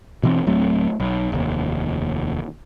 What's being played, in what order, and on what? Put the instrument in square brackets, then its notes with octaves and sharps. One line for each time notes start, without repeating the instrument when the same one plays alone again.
[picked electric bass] B2 E3 C4
D1 F#3 A3 C4
B1
F1 D#2